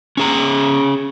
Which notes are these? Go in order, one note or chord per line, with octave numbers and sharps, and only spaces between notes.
C#4 G#4 A#5